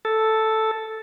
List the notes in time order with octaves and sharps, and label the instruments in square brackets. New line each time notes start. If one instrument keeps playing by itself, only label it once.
[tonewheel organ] A4